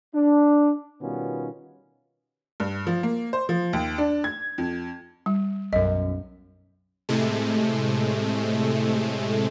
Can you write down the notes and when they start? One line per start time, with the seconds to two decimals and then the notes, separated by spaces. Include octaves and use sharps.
0.14 D4
1.01 B2 D#3 G3 B3 C#4 F4
2.60 G2
2.87 F3
3.03 A#3
3.33 C5
3.49 F3
3.73 D#2
3.98 D4
4.24 G#6
4.58 F2
5.26 G3
5.73 B1 F#2 D#5
7.09 A2 C3 G#3 A3